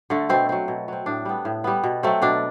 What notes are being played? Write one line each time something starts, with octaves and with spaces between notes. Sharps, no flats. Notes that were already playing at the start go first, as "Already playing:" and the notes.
D3 A3
B2 C4
F#3 C4
B2
F#3 C4
A2 D4
G3 B3
A2
G3 B3
B2
F#3 A3 C4
B2 D4